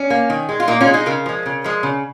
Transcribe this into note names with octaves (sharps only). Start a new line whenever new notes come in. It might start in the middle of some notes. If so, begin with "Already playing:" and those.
Already playing: C#4
A#3
D#3
G#3
F4
A#2 A#3 D#4
C#4 F4
G#3
D#4 G#4
C#3 F4 A#4
F3 G#3
C#3
F3 G#3
C#3